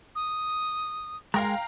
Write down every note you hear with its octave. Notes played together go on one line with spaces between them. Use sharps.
D#6
G#3 A#4 F5 G5 A#5